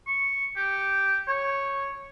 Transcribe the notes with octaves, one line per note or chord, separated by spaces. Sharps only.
C#6
G4
C#5